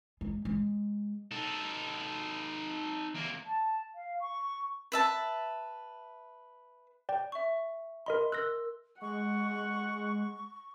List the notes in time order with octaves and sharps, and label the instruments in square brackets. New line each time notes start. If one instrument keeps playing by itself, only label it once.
[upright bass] G#3
G#3
[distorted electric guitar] D#4 A4
E2 A#3
[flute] A5
F5
C#6
[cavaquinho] B4 E5 A5
[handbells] D5 G5
[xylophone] E5 C#6
[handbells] A#4 D#5 B5 [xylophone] C6
[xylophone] A#4 E6 [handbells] F#6 A#6
[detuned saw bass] G#3 [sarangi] F#5 [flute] C#6